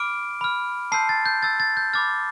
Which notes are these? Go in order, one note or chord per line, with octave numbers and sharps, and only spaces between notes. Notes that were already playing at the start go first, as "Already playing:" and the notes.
Already playing: B5 D6 F6 D7
B5 F6
A5 C6 E6 G6 C7
A6
G6
A5 E6 G6 A6
A6
G6
B5 D6 F6 A6